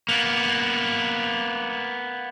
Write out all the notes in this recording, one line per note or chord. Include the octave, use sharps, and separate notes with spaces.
A#3 B3